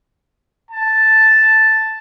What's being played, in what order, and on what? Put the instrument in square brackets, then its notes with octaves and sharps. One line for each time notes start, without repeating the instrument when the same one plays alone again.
[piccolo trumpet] A5